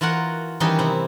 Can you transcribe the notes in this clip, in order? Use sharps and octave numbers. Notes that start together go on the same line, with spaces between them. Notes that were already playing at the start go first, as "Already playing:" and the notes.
E3 F4 F#4 A#4 F#5
D#3 E3 G3 C#4 D#4 G4
C3 E4